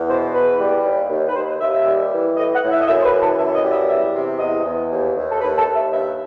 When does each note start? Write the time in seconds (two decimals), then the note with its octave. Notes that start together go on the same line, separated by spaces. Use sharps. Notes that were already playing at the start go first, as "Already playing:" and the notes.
Already playing: E2
0.09 B2 C5
0.33 E2 B4
0.59 G3
0.84 D#2
1.10 D#2
1.28 B4
1.36 D#2 C5
1.48 D#5
1.61 D#2 E5
1.69 D#5
1.73 E5
1.86 G3
2.12 E3
2.37 A2 D#5
2.54 F#5
2.63 A2
2.71 E5
2.81 D#5
2.87 F#2 E5
3.00 C5
3.04 B4
3.13 E3
3.22 A4
3.38 F#2 E5
3.55 D#5
3.64 G3
3.72 E5
3.89 E2 E5
4.14 C3
4.39 E2 D#5
4.65 E2
4.91 D#2
5.17 D#2
5.32 A4
5.41 D#2 B4
5.58 A4
5.67 D#2
5.76 E5
5.92 G2 E5